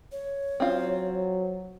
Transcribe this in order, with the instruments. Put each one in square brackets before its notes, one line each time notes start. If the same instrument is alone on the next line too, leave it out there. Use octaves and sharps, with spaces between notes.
[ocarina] C#5
[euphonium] F#3 [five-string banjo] C4 F4